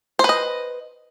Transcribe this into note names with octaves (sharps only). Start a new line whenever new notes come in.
B4 C5 D#5